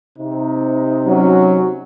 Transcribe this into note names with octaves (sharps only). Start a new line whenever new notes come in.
C3 D#4
F#3 C#4